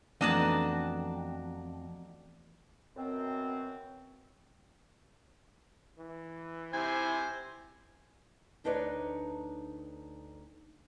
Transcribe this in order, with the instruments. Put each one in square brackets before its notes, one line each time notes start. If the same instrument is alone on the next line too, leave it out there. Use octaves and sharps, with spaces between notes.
[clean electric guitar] F2 [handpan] E3 A3 B3 [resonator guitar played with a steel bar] D4 [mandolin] D#4 F#4 A5
[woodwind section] F#2 B2 C4
[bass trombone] E3
[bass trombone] C3 [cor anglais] E4 [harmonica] C5 G#5 [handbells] G#6
[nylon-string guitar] D2 D4 D#4 B4 C#5 D5